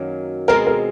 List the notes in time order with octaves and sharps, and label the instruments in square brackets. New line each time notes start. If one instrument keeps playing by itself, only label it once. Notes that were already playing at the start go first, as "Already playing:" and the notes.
Already playing: [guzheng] F#2 D#3 F#3 A#3
[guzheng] B2 G#3 C4 F4 [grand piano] A#4
[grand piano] A#4